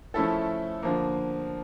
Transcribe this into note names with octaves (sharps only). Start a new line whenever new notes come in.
F3 A3 C#4 E4 A4
D3 F3 A#3